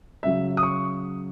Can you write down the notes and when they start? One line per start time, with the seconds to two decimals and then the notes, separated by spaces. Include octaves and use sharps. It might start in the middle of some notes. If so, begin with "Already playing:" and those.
0.23 C#3 F#3 E5
0.57 D#6
0.63 C#6